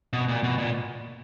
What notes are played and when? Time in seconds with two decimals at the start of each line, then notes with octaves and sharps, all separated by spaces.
0.13 B2
0.28 A#2
0.43 B2
0.58 A#2